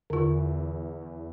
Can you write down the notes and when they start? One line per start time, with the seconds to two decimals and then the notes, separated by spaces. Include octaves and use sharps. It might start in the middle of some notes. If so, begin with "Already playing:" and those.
0.10 E2 D3 F4